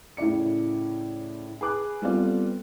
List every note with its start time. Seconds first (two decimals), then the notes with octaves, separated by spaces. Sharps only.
0.17 A2 C#3 E4 D5 C#7
1.61 G#4 B4 D6 F#6
2.02 G3 B3 C4 F4 A4 D5